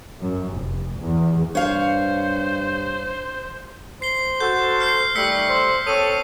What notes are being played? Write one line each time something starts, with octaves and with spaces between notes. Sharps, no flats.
F#2
F1
E2
G2 C5 C#5 F5
C5 C7 G7
F#4 A4 G6
F6 G6 C7
D#3 G3 A3 E6 B6 C#7
C5
C4 A4 C#5 D#6 D#7